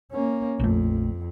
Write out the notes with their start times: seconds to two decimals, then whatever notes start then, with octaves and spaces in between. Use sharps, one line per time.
0.12 A#3 C#4
0.60 A#1 F2 A3